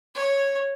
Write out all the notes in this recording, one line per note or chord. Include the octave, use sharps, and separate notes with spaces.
C#5